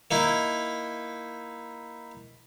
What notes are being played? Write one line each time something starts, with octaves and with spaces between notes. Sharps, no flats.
A#3 D#4 E4